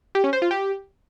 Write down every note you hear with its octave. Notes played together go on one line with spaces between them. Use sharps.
G4
C#4
C5
F4
G4